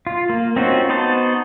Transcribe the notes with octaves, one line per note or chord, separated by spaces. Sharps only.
F4
A#3
C4 C#4 D#4 F4 F#4
B3 D#4 F#4 C5 A5